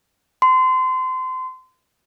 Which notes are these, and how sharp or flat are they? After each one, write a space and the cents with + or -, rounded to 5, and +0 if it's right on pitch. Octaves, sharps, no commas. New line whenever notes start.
C6 -30